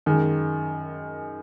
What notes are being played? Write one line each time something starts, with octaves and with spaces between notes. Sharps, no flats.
F#2 D#3 G#3